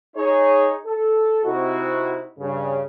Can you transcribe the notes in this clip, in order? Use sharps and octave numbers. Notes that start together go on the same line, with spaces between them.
D#4 G#4 C#5
A4
C3 D#4 E4 F#4
G2 C#3